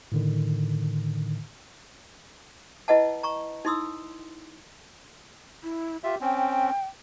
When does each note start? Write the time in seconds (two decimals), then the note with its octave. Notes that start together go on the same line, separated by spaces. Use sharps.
0.12 A2 D3 D#3
2.88 E4 B4 D#5 F#5 A5
3.23 A#5 C#6
3.65 D#4 E4 C6 D#6 E6
5.63 E4
6.04 F4 G4 E5
6.21 C4 C#4 G5